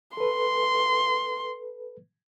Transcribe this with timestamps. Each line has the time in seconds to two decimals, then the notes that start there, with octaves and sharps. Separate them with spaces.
0.17 A4 B4 C6